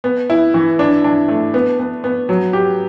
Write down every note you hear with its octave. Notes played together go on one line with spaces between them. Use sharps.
B3
E4
E3
D4
D4
A3
B3
B3
B3
F#3
G4